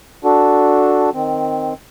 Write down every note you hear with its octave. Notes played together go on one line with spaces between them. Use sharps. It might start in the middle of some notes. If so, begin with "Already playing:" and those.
D4 F#4 A4
D#3 C4